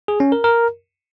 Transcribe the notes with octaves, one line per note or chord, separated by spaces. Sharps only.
G#4
C#4
A#4
A#4